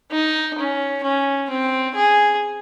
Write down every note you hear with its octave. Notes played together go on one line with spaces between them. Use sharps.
D#4
C#4
C#4
C4
G#4